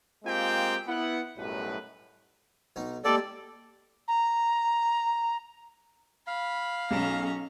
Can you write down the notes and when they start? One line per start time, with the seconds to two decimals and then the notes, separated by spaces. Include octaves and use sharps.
0.25 G#3 A#3 C4 F4 G4 G5
0.87 B3 E4 F#5
1.37 B1 F#2 A2 G3 B4
2.76 B1 D#4
3.05 G3 G#3 A#3 A4 D5
4.08 A#5
6.27 F5 B5
6.91 B1 C#4 G#4 A#5 E7